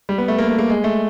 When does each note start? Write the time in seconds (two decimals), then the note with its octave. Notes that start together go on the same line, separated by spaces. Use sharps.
0.09 G3
0.18 B3
0.28 A3
0.38 A#3
0.49 B3
0.59 A#3
0.70 G#3
0.84 A3